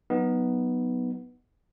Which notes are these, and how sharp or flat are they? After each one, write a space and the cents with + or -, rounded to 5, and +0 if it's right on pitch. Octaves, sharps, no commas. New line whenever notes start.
F#3 +0 B3 +0 D#4 +0